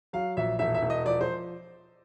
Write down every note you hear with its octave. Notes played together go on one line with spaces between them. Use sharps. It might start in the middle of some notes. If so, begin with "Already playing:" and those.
F#3 F5
A#1 E5
E1 E5
E5
E1
D#5
F3 D5
C5